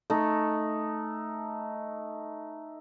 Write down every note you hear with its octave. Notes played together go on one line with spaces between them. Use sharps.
A3 D#4